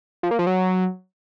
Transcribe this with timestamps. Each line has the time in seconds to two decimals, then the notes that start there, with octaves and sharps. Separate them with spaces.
0.23 F3
0.31 A#3
0.39 F3
0.47 F#3